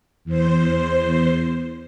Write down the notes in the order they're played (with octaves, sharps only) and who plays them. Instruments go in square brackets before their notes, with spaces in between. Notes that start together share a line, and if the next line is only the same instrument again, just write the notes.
[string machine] E2 C5